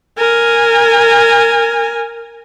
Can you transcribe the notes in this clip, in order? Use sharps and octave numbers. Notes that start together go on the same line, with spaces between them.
A#4 G#5